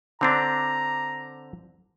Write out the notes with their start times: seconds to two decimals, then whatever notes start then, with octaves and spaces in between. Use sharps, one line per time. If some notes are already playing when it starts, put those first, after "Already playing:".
0.21 D3 C4 D4 A#5